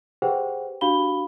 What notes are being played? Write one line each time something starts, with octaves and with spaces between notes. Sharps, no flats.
G4 G#4 B4 C5 F#5 G5
D4 F#4 G4 F5 B5 G7